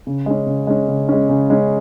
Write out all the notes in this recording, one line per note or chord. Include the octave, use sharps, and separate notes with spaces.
C#3
G#3 C#4
C#3
G#3 C#4
C#3
G#3 C#4
C#3
G#3 C#4